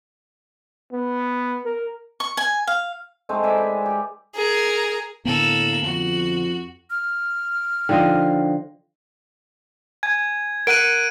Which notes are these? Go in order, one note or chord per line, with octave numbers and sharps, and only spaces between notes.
B3
A#4
C#6
G#5
F5
G#3 A3 C4 D#4
B4 D5 E5 G#5
G#4
G4
G#4 A#4
A2 D3 A#3 B3 A4 F#7
F2 F#4
F6
D3 F3 D#4 D#5 G5
G#5 G#6
A#4 F#5 F#6 D7 D#7